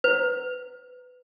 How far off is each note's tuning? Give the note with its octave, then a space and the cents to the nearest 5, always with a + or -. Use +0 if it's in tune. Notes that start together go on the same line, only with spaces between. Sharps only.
B4 +20